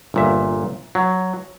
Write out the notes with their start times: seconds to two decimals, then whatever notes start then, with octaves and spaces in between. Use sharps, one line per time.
0.14 G1 A#2 E5
0.95 F#3